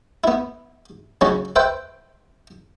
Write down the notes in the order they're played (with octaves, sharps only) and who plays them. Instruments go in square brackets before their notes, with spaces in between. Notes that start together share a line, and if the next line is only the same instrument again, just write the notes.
[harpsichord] B3 E4
C#3 F#3 C#4 F#4
B4 C5 E5 G5